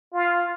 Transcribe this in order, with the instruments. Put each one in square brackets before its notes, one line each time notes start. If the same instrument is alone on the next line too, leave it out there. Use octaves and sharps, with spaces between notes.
[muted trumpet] F4